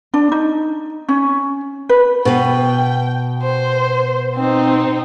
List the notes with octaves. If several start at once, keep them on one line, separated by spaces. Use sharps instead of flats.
D4
D#4
C#4
B4
B2 B4 G5
C5
C4 D#4